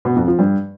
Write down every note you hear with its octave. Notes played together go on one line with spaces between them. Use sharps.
B2
F2
F3
G2